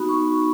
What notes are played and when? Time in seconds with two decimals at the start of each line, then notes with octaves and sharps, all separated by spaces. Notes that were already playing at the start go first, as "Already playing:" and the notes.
Already playing: B3 D#4 F#4 B5
0.09 C#6